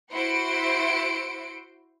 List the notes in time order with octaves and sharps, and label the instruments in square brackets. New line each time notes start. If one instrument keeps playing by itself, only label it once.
[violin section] E4 F#4 C5 C6 C#7 D7